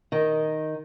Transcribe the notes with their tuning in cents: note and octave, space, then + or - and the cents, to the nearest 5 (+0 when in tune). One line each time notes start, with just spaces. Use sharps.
D#3 +0 D#5 +0